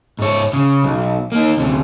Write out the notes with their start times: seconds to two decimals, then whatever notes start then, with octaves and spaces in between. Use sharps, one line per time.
0.19 G#2 C#5
0.53 C#3
0.83 B1
1.32 A#3 D#4
1.57 D2 C3